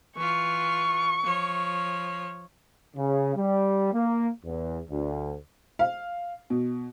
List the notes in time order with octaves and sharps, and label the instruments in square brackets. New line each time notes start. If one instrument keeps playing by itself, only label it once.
[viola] E3 F4 [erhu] C#6
[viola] F3 C#5
[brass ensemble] C#3
G3
A#3
E2
D2
[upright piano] F5
B2